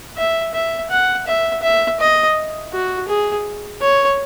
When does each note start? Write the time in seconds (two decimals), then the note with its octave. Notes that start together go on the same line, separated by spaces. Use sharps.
0.17 E5
0.54 E5
0.90 F#5
1.27 E5
1.62 E5
2.00 D#5
2.72 F#4
3.08 G#4
3.81 C#5